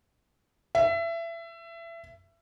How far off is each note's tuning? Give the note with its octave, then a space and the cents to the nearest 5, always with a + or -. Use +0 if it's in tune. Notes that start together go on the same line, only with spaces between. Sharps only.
E5 +25